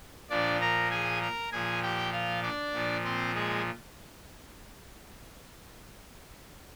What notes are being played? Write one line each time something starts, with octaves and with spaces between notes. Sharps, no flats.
A#2 F3 D4 D5
A#4 A#5
G#4 G#5
A#4 A#5
A#2 F3 G#4 G#5
G4 G5
F4 F5
D4 D5
A#2 F3
C4 C5
G#3 G#4